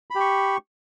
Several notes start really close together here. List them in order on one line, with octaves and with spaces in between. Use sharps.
B5 G4 C#6